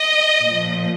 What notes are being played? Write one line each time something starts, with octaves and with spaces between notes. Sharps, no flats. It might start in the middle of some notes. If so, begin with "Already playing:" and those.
Already playing: D#5
A#2 F3